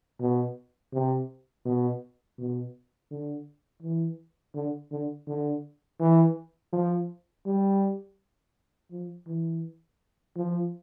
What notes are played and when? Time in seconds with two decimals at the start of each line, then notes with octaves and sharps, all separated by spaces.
0.20 B2
0.93 C3
1.66 B2
2.38 B2
3.11 D3
3.82 E3
4.55 D3
4.92 D3
5.28 D3
6.00 E3
6.73 F3
7.46 G3
8.91 F3
9.27 E3
10.36 F3